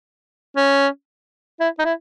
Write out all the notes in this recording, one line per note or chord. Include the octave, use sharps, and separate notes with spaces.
C#4
E4
D#4
E4